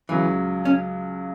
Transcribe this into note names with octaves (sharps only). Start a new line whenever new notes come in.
C#2 C#3 E3 F#3
C#4